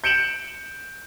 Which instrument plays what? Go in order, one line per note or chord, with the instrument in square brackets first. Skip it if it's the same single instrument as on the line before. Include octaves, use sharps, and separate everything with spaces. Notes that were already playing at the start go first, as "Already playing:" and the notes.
[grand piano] G6 C#7 D7 E7 F#7